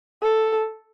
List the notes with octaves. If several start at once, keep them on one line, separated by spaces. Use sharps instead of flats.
A4